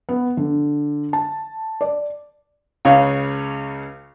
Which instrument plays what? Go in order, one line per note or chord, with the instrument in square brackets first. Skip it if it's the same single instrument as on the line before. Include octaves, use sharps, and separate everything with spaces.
[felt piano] B3
D3
A5
D5
[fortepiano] C#2 C#3 C#5 [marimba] F5